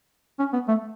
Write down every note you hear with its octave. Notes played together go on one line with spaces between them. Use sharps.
C#4
B3
A3